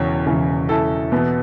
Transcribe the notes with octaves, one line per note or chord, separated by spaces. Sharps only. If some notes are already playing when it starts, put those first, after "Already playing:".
Already playing: E1 E2 C#3 C#5
E1 E2 C#3 E3
E4 A4
E2 B2 B3